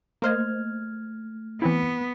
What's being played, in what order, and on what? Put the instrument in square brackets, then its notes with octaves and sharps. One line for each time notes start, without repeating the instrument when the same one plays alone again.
[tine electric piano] A3 F6 G#6 [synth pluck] A#3 C5 D#5
[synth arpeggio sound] E3 C4 E4 [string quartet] B3